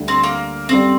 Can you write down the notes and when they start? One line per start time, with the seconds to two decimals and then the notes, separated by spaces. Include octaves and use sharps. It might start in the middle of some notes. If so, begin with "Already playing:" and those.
Already playing: D2 D3 G3 D4
0.08 C4
0.23 A#3
0.69 F#2 D3 G3 C4